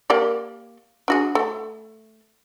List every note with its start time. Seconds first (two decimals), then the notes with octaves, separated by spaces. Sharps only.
0.10 A#3 G4 D5
1.08 D4 F#4 G#4
1.35 A3